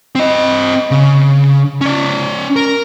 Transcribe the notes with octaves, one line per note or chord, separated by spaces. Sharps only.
C4 D#5
C#3
C#4 D5
A#4